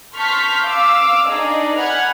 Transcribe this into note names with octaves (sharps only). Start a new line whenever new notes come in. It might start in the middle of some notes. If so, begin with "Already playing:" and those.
A5 C6 C#6 F6 G6 B6
F5 D6 E6
D4 D#4 G#4 D5
F#5 G#5 B5 F6 F#6 G#6